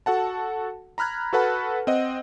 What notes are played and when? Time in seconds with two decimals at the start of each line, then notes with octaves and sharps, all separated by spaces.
0.06 F#4 A4 F#5 A5
0.98 A#5 B5 F6 F#6 G#6
1.33 F#4 A4 B4 F#5 A5 B5
1.87 C4 D#5 F#5